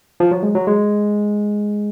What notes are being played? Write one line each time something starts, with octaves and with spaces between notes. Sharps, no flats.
F3
F#3
G#3
F#3
G#3